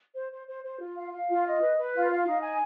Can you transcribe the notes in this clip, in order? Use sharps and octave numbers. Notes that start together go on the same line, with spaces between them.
C5
C5
C5
C5
F4
F5
F5
F4
D#5
B4
B4
F4
F5
D#4
G#5